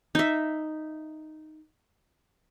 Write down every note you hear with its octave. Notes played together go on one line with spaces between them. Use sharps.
D#4 E5